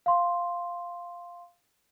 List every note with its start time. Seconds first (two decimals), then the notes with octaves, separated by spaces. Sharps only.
0.06 F5 C6